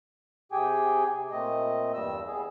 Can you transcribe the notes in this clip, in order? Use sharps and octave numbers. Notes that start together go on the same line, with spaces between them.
C3 G4 G#4 G5 G#5
A#2 A3 C4 D#5
E2 G2 G3 E6
B3 G#4